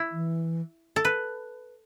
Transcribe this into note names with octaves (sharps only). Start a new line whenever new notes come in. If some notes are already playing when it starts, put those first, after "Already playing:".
Already playing: E4
E3
A4
B4